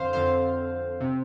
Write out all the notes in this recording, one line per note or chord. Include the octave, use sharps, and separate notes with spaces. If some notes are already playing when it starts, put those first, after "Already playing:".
Already playing: F2 D3 C5 F5
F2 D3 C5 F5
C3